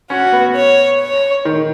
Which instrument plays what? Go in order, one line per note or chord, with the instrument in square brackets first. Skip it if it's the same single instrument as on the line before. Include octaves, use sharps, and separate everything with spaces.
[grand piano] C#4 [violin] F#4
[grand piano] B3
[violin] C#5
C#5
[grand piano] D#3